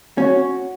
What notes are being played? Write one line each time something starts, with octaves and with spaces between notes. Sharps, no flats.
C#4 F#4